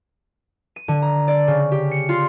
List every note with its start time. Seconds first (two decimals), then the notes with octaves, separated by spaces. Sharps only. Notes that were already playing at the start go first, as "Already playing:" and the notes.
0.76 D#7
0.88 D3
1.02 A#5
1.28 D5
1.48 C#3
1.72 G4
1.91 C#7
2.09 F4